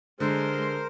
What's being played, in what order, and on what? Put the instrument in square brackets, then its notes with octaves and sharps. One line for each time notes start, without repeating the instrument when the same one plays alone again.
[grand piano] D3 [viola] G#3 C6 [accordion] A#4 C5